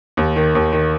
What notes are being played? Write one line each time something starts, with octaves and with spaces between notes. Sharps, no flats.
D#2
D#3
D#2
D#3